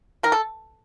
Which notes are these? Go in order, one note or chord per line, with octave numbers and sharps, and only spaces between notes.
D#3 A#4
A4